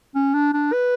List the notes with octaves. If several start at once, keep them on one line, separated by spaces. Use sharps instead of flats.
C#4
D4
D4
B4